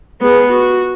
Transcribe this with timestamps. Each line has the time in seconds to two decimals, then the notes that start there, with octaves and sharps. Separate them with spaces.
0.21 B3 G#4
0.53 F#4